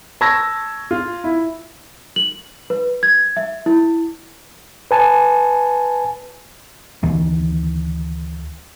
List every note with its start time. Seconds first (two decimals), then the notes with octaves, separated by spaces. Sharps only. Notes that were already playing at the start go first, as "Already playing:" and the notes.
0.21 A5 C#6 E6 G#6 A#6
0.91 F4
1.24 E4
2.16 F#7
2.70 B4
3.03 G#6
3.37 E5
3.66 E4
4.91 B4 G#5 A5
7.03 D2 D#3 E3